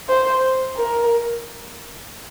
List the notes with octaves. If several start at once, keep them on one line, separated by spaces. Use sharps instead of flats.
C5
A#4